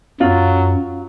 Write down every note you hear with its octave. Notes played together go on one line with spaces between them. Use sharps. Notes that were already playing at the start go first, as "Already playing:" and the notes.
F#2 F#3 F4